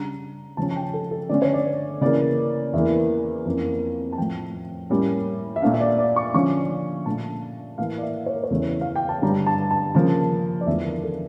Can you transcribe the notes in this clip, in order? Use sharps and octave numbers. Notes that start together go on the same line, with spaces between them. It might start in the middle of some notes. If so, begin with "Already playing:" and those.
Already playing: C#3 G3 D4 A#5
C#3 F3 C#4 A5
A5
G5
A4
A4
D3 A3 C#4 D5
C#5
D5
C#3 E3 A#3 D5
E2 E3 A#3 E5
F2 E3 A#3 C#4
A5
A2 F3 A3 G5
A2 G3 A#3 C#4
E5
A#2 A3 D4 F5
E5
D5
D5
C#6
D3 F3 C#4 C#6
A#2 A3 D4 A5
A2 E3 A#3 F5
D5
E5
C#5
A#4
C#5
E2 C#3 E3 A3
F5
G5
A5
G2 D3 G3 A#5
A5
A5
C#3 F3 A#3 A5
D5
E2 D3 F3 A3 E5
A#4
A4